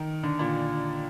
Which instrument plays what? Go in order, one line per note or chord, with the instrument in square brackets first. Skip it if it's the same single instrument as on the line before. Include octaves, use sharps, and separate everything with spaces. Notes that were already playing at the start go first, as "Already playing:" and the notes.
Already playing: [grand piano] D#3
D3
A#2